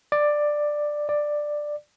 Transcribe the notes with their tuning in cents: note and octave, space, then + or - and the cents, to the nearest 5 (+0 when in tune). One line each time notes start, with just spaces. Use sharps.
D5 +10
D5 +10